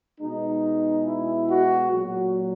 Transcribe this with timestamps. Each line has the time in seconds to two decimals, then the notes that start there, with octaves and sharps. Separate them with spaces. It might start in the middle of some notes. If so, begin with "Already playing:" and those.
0.19 B2 G#3 D#4
1.05 E4
1.49 F#4
1.90 A#2 F#3 F#4